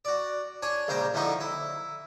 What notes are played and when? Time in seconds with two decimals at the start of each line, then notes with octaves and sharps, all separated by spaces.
0.05 F#4 D5
0.62 D4 C#5 G#5
0.88 A#1 C#3 D4 C5 G5 A#5
1.14 F2 A2 D3 F3 D#4 C#6
1.40 E4